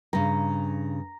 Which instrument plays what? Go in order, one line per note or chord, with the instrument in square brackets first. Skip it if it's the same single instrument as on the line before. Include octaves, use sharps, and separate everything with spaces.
[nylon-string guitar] G2 C#3 [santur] A#5